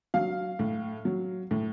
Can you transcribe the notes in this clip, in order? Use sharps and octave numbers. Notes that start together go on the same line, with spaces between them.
F#3 F5
A2
F#3
A2